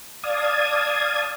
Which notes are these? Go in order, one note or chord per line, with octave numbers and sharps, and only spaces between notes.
D5 F5 A5 D#6 G#6